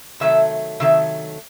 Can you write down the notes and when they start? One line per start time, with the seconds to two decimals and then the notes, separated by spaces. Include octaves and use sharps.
0.20 C3 D#3 F#3 A3 E5
0.80 C3 D#3 F#3 A3 E5